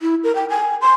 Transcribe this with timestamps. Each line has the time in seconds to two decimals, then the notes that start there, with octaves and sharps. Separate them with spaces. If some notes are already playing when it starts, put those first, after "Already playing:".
0.02 E4
0.24 A#4
0.35 G5
0.50 G#5
0.82 C6